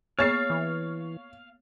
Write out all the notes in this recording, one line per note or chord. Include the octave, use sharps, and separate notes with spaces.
A#3 B3 G#4 C#5 F5 A6 C7
E3